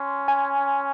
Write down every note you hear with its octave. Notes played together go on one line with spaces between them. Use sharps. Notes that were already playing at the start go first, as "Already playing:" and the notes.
Already playing: C#4 C6
G#5